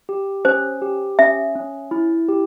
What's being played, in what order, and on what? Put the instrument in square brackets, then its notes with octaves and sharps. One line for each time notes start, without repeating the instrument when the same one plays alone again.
[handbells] G4
[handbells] C#4 [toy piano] C5
[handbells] G4
[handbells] C#4 [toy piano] E5
[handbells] C#4
E4
G4